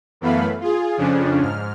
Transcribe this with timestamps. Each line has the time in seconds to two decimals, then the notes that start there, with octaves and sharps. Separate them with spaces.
0.21 F#2 E3 A3 B3 F5 B5
0.60 F4 G#4
0.97 F2 C#3 F3 C#4 D4
1.41 G#2 F6